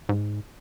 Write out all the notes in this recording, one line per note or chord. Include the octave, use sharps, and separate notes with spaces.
G#2